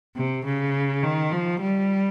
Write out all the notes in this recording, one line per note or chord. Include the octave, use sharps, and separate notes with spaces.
C3
C#3
D#3
F3
G3